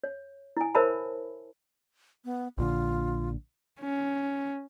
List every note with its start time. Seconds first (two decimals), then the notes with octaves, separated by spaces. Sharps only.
0.04 C#5
0.57 E4 G#5
0.75 A#4 C5 C#5 E5 A5 B5
2.25 B3
2.58 A#1 A#2 D3 F4
3.81 C#4